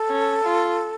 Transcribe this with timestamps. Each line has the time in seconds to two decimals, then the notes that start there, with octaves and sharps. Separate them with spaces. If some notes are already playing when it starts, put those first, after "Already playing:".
Already playing: A4
0.08 C#4
0.44 F4